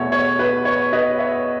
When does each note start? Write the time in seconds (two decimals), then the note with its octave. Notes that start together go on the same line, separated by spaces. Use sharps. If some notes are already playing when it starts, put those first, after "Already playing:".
Already playing: E2 B2 A3 C#5
0.12 C#5
0.39 B4
0.65 C#5
0.92 B4 D#5
1.18 C#5 E5